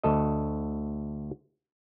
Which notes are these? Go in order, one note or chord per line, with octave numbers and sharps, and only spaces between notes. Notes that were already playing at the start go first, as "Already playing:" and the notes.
D2 A4 D#5